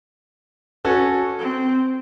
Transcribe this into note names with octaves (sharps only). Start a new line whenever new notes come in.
C#4 F#4 A4
C4